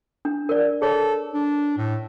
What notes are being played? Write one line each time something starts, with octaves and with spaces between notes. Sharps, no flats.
D4
A#4 D5
G#4 A4 C#5
D4
A2